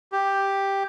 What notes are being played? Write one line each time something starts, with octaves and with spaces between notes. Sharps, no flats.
G4